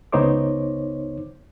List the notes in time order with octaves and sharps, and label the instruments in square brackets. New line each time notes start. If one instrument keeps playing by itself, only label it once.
[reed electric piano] C#2 B3 D#4 C5 C#5 D6